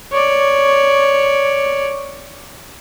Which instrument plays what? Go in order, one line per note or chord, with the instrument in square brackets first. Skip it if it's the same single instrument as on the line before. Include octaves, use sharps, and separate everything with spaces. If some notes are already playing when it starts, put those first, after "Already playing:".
[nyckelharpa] C#5 D5